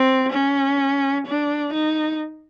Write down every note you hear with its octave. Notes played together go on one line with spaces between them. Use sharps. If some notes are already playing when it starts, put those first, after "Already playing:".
Already playing: C4
C#4
D4
D#4